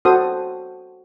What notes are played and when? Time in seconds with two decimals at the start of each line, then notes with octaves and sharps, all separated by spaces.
0.05 F#4 A4 C5 D#6